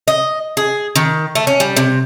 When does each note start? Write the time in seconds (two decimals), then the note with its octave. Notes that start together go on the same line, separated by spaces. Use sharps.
0.08 D#5
0.57 G#4
0.96 D#3
1.35 A3
1.47 C#4
1.60 G3
1.77 C3